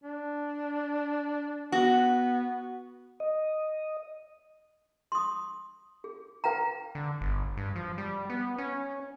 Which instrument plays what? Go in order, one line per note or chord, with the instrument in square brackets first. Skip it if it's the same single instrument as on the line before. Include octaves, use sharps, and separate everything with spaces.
[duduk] D4
[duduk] B3 [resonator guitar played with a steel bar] F#4
[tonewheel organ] D#5
[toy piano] C6 D#6
G#4
B4 F5 G5 A#5
[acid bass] D3
G1
G2
F3
G3
B3
C#4